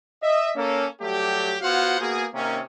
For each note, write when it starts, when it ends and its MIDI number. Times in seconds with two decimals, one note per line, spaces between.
0.22 0.50 75
0.22 0.50 76
0.56 0.86 58
0.56 0.86 61
0.56 0.86 69
1.01 1.57 54
1.01 1.57 55
1.01 1.57 57
1.01 1.57 67
1.61 1.98 59
1.61 1.98 65
1.61 1.98 66
1.61 1.98 72
1.61 1.98 77
1.61 1.98 78
2.00 2.26 58
2.00 2.26 59
2.00 2.26 66
2.00 2.26 68
2.34 2.60 48
2.34 2.60 51
2.34 2.60 58
2.34 2.60 61